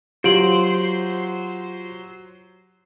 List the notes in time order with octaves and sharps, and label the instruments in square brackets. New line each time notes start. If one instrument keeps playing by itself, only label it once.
[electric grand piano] F#3 [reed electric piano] F4 [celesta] G4 D7 F#7 [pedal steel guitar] C5